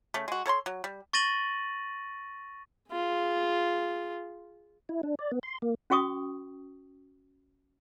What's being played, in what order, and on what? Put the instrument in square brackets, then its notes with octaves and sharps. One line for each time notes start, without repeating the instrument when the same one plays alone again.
[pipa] C#3 A3
G#3 F#4
A4 C#5 A#5 C6
F#3
G3
[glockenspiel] C#6 A6 A#6 D#7 F#7
[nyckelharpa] F4 G#4
[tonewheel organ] E4
D4
D5
B3
C6
A#3
[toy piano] C#4 F#4 G5 C#6 D#6